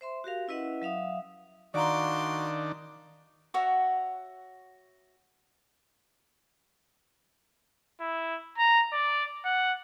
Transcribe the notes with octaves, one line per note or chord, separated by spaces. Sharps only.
C5 E5 C6
F#4 G4 A#4 F5
C#4 E4 B4 D#5 E5 F#5
F#3 E5 F5 D#6
D#3 D4 F#4 D5 F5 A#5 C6 D6
F#4 C#5 E5 F#5
E4
A#5
D5
F#5